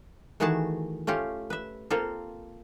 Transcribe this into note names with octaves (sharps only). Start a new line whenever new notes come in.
D#3 E3 A3 F#4 G#4 A5
A3 C#4 F4 G4
B4 E5
A#3 C4 F4 A4